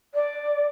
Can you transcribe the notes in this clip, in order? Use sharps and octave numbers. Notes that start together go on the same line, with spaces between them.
D5